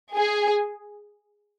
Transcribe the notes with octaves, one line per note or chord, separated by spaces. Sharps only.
G#4